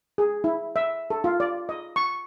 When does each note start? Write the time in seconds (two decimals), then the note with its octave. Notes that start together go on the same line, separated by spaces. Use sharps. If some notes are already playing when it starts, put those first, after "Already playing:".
0.18 G#4
0.44 E4
0.76 E5
1.10 A4
1.24 F4
1.40 D5
1.69 D#5
1.96 C#6